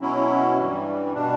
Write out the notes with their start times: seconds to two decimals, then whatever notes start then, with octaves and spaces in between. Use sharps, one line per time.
0.01 B2 F#3 C#4 E4
0.57 G2 E3 G3
1.15 B2 G3 D4